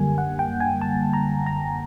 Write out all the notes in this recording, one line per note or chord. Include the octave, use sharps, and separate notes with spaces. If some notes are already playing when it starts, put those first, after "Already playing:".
Already playing: F#2 D3 G3 A#3 G#5
F#5
G5
G#5
A5
A#5
A#5